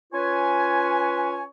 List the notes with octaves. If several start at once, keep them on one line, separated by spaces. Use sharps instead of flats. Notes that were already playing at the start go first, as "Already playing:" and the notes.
C#4 F4 B4 C#5 G#5